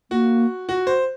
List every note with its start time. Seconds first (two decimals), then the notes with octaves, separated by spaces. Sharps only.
0.11 A#3 F#4
0.69 F#4
0.87 C5